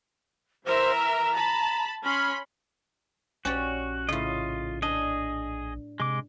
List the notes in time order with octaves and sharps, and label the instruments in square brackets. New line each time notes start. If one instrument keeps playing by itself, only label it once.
[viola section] E3 A#4 E5 [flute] C5
[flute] A#5
[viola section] A5 B5
[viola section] C#4 B5 C6 [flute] F6
[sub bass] A#1 [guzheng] C#4 G4 D5 [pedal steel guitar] F#4
[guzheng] A2 C#3 [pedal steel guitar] F4 D#5
[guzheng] D4 [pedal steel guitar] G#4 D#5
[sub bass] C3 [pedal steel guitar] G#3 D6